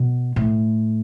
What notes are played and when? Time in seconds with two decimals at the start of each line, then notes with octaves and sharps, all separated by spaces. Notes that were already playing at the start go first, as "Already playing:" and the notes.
Already playing: B2
0.36 A2